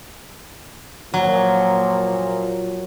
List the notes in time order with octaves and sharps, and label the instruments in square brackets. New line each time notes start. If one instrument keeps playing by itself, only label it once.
[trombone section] A#2 F3 [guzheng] F#3